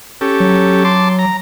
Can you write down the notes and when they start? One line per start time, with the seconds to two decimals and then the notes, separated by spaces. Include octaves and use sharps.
0.21 C#4 G4 A4
0.40 F#3
0.85 A5 C6 D6
1.19 A#5